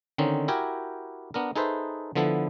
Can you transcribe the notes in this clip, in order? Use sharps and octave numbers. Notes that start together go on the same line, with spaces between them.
D3 D#3 C4 C#4 D#4
E4 F#4 G4 A#4 G5 G#5
B3 D4 A#4
D#4 G#4 A4 B4 C5 E5
D3 F3 B3 E4 A4